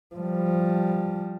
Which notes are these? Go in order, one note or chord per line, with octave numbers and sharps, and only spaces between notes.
F3 G3